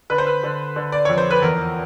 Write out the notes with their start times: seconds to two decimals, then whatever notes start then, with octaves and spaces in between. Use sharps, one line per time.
0.10 D3 B4
0.18 C5
0.27 B4
0.44 D3
0.76 D3
0.92 D5
1.05 F2 C#5
1.18 C5
1.30 B4
1.42 E2 A#4